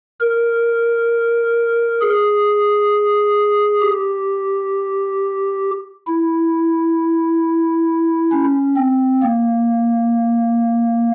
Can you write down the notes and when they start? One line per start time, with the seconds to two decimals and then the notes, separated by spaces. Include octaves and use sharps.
0.20 A#4
2.01 G#4
3.81 G4
6.07 E4
8.32 C#4
8.77 C4
9.22 A#3